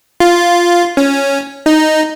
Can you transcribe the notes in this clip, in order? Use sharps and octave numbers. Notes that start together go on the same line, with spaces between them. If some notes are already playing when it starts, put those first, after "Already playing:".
F4
C#4
D#4